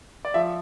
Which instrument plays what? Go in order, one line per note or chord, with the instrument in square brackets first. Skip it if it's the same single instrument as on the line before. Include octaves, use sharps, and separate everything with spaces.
[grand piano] D5
F3 E5